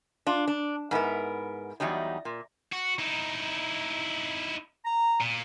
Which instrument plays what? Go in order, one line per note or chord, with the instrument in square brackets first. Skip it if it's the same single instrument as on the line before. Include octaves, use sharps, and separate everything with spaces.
[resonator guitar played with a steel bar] D4 F4
D4
G#2 B3 E4 A#4
E2 F#3 G3 D#4
A#2
[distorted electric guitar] F#4
D#4 E4
[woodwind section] A#5
[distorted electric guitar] A#2